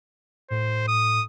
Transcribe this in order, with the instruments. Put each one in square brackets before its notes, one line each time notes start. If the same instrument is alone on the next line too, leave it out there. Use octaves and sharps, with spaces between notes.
[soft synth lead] A2 [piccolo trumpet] C5
[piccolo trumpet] D#6